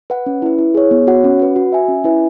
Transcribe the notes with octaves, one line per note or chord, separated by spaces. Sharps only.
B4 F#5
C#4
E4 B4
E4
G#4 C#5
B3
F#4 C#5 F#5
C#4
F#4 B4 F#5
F#4
E5 G#5
C#4
E4 B4 E5 G#5